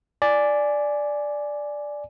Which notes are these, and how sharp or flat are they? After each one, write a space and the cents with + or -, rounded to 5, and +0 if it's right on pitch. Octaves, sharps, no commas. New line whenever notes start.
D5 +0 G#5 +10